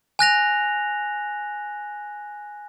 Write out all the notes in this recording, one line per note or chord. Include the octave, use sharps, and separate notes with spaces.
G#5 F#6 A#6 F7